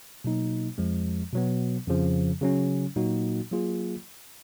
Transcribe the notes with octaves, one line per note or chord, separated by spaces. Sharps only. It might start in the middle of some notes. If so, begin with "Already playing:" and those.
B2 F#3 A#3 D#4
F2 F3 G#3
B2 F#3 B3
F2 C#3 F3
C#3 F#3 C#4
A#2 F#3 A#3 D#4 F#4
F#3 A#3 F4 G#4